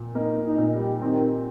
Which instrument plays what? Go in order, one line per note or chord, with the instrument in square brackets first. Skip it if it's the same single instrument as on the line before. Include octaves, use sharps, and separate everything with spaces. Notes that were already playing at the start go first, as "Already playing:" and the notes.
Already playing: [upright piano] A#2
[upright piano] A#3 [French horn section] D#4
[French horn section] D#4
[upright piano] A#2
[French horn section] G3
[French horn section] D#3 [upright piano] C4